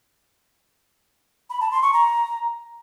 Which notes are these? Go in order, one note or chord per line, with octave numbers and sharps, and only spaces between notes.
B5
A5
C6
C#6
A#5